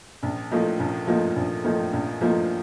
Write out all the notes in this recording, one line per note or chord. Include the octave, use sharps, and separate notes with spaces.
A#1
A2 F3 A#3 D#4
A#1
A2 F3 A#3 D#4
A#1
A2 F3 A#3 D#4
A#1
A2 F3 A#3 D#4